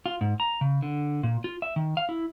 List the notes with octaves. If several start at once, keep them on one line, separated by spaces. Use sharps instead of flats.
F4
G#2
A#5
C#3
D3
A#2
F4
E5
D#3
F5
E4